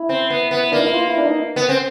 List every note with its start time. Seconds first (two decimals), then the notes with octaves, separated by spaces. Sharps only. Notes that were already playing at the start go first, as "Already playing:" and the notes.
Already playing: E4
0.09 C4
0.30 B3
0.51 B3
0.72 A#3 D4
0.79 D#4
0.87 E4
0.94 F4
1.10 E4
1.18 D4
1.26 D#4
1.56 B3
1.69 C4